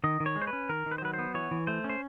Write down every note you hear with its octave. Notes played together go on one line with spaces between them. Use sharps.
D#3 D#5
D#3
C#5
G#3
C5
B4
C#4
D#3 A#4
D#3
B4
C5
F#3 B4
C5
B3
E3 C#5
E3
A3 C5
C#4
C5